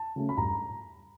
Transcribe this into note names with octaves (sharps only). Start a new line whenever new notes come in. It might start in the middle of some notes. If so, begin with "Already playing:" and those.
Already playing: A5
C#3 F#3 A3 C#4
B5
G2 A#5